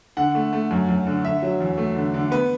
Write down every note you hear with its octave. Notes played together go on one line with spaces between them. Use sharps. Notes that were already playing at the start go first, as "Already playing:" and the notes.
D3 F#5
A3
A3
F#2
F#2
D3
D3 E5
F#3
E2
A3
D3
D3
B3 B4